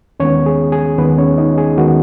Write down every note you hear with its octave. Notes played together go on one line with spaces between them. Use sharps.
D#2 D#3 G#3 B3 C#4 C#5
G#4
G#4
D#2 D#3 G#3 B3 B4
C#4 C#5
D#4 D#5
G#4
D#2 D#3 G#3 B3 F#4